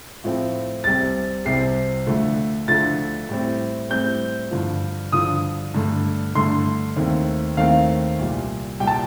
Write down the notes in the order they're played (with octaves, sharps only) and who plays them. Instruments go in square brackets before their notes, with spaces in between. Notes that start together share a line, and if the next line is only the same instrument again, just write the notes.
[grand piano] A2 F3 A3 C4
C2 C3 G3 C4 A6
C2 C3 G3 C4 C7
D2 D3 F3 A3
D2 D3 F3 A3 A6
A2 G3 C4
A2 G3 C4 G6
G2 D3 F3
G2 D3 F3 D#6
G2 D3 A3
G2 D3 A3 C6
D#2 D#3 A3 C4
D#2 D#3 A3 C4 F5
C2 A#2 G3
C2 A#2 G3 G5
A5